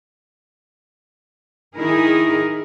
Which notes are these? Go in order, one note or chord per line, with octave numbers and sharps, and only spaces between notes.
D#3 D#4 E4 G#4 A#4